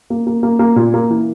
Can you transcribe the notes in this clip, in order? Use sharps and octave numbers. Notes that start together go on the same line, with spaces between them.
A#3
A#3
A#3
A#3
A#2
A#3
E3